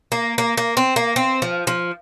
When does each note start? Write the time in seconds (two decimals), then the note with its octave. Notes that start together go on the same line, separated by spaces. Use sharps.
0.12 A#3
0.38 A#3
0.57 A#3
0.77 C4
0.96 A#3
1.16 C4
1.42 F3
1.67 F3